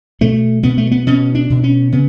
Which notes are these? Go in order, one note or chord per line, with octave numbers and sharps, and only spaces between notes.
B2 A3
B2 B3
A3
B3
B2 C#4
D4
B2
C#4
C#3 B3